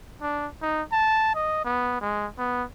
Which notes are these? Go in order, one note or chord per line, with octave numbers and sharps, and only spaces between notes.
D4
D#4
A5
D#5
B3
G#3
B3